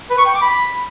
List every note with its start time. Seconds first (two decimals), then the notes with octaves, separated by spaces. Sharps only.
0.10 B4
0.18 C#6
0.26 G5
0.34 D6
0.42 B5